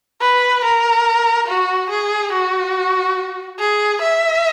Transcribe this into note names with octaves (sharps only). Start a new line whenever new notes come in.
B4
A#4
F#4
G#4
F#4
G#4
E5